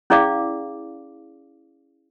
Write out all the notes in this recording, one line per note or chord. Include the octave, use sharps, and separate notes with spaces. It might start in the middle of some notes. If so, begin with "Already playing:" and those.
C#4 E4 G#4 D5 F5 D6